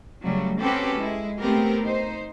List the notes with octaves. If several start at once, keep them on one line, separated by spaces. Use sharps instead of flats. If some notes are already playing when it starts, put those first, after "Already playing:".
C#3 F#3 G3 A3
C4 C#4 F#4 G4 A4 B4
G#3 E4
A3 B3 C4 G4 A#4
D#4 C5